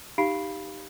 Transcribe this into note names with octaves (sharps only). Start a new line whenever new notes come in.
D#4 G4 F5 B5 C7 D7